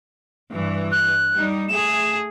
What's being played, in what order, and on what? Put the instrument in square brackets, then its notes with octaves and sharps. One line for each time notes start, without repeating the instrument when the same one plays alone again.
[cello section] G2 E3
[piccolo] F#6
[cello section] G3 D#4
[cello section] A3 G#4 [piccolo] E7